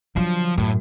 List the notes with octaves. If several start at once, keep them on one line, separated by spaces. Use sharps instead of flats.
D3 F3 F#3
F#2 A2